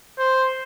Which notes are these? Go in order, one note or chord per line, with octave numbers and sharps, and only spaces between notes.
C5